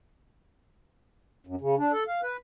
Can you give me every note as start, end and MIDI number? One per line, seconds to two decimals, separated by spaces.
1.47 1.55 42
1.61 1.75 49
1.78 1.92 62
1.92 2.04 69
2.07 2.21 77
2.23 2.37 71